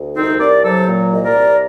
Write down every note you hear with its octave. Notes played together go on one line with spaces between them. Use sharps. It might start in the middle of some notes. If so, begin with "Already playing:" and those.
Already playing: D2
C2 C4 D#4
C2 A#4 D5
F#3 A4 C5
A#2
C2 D#5
A#4 D5
C2